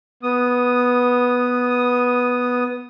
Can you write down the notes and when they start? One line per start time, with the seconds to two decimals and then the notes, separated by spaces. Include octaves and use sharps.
0.23 B3 D#6